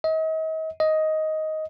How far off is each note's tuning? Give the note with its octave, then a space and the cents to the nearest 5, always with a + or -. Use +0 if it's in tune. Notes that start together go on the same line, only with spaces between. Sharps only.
D#5 +40
D#5 +10